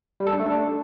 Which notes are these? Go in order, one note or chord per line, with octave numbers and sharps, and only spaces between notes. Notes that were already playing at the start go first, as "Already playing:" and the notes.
G3
A4
D4
A3
D4